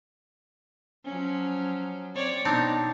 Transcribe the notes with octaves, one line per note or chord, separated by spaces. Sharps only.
F3 F#3 C#4
C4 C#5 D5
B2 C4 D4 D#4